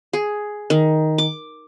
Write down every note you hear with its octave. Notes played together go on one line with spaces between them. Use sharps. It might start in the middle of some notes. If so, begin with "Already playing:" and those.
G#4
D#3
D6